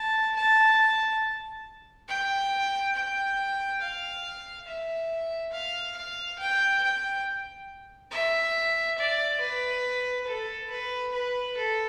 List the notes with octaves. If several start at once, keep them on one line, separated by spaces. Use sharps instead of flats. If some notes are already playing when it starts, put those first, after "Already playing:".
Already playing: A5
A5
G5
G5
F5
E5
F5
F5
G5
G5
E5
D5
B4
A4
B4
B4
A4